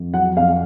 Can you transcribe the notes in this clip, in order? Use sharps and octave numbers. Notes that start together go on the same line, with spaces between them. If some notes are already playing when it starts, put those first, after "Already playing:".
Already playing: F2
F#3 F#5
F2 F5